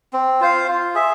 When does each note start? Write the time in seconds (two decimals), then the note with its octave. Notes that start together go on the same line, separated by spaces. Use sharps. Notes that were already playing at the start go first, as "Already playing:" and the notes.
0.13 C4
0.40 F4 C5 F5
0.68 F4
0.95 G#4 E5